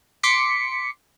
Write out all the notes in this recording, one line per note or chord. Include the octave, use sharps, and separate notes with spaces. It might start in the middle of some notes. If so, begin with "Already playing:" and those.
C6 D6 B6 C#7